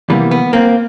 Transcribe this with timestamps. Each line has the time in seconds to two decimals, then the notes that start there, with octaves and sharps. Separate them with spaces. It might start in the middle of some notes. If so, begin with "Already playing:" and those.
0.09 E2 C3 E3 G3 A#3 B3
0.31 B3
0.53 A#3 C4